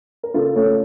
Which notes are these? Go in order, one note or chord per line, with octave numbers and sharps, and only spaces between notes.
A#4
C#3 F4 A4
A3 A4 C#5